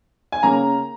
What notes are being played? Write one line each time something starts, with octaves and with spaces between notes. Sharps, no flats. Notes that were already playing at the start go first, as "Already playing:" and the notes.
G#5
C#3 A#3 C#4 A#5